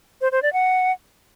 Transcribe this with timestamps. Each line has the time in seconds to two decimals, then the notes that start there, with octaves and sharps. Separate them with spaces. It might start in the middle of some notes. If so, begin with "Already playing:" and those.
0.21 C5
0.32 C5
0.42 D5
0.53 F#5